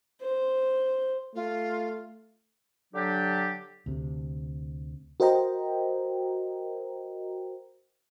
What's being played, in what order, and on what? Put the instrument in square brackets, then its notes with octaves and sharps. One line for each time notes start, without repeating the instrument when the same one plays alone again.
[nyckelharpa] C5
[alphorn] A3 [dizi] F4
[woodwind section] D3 F#3 D4 G4
[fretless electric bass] D2 C3
[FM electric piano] F#4 A#4 C5 D#5 G5 A#5